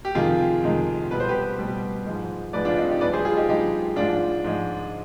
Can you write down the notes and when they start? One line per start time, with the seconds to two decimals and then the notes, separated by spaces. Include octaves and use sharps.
0.05 G4
0.15 F2 C3 D#3 G#3 F4 G#4
0.63 F2 C3 D#3 G#3
1.11 B2 G3 B4
1.20 C5
1.29 G4 B4
1.58 B2 G3
2.06 G#2 F3 G#3
2.53 G#2 F3 G#3 B4 D5
2.65 D4 F4
2.77 C4 D#4
2.89 D#4 G4
3.01 G2 F3 G#3 B4 D5
3.13 G#4 C5
3.25 F4 G#4
3.37 D#4 G4
3.49 G2 F3 G#3 D#4 G4
3.96 G#2 F3 G#3 D4 F4
4.44 G#2 F3 G#3